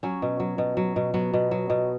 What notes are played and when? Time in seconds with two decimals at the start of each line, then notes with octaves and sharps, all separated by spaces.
0.03 F#3 C#4
0.22 B2
0.40 F#3
0.58 B2
0.77 F#3
0.96 B2
1.14 F#3 B3
1.34 B2
1.51 F#3
1.70 B2